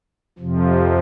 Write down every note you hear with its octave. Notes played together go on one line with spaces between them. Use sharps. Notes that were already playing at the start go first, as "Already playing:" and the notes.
F2 C3 F3